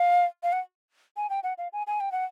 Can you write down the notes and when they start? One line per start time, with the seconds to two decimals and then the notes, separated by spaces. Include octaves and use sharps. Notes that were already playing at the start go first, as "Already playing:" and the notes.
Already playing: F5
0.43 F5
0.52 F#5
1.17 G#5
1.30 G5
1.43 F#5
1.58 F5
1.73 G#5
1.87 G#5
2.00 G5
2.12 F#5